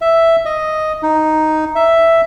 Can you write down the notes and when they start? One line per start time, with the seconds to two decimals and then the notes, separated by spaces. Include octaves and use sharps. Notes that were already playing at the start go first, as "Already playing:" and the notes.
0.01 E5
0.45 D#5
1.03 D#4
1.75 E5